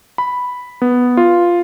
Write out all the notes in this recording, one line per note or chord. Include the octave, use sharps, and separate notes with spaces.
B5
B3
F4